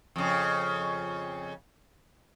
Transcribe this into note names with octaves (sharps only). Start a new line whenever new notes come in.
F2 C#3